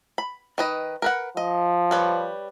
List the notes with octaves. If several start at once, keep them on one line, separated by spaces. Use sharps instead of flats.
B5
D#3 B4 D#5
A#4 B4 F#5
F3 D#5
G3 B4 C#5